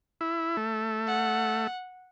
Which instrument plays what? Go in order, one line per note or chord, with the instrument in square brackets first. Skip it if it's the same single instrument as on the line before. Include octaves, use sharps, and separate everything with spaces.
[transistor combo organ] E4
A3
[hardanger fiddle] F#5